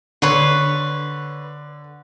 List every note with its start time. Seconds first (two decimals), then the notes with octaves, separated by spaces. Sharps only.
0.22 D3 B4 C#5 C6